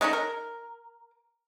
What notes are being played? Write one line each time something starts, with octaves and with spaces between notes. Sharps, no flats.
G#3 A3 C#4 D#4
A#4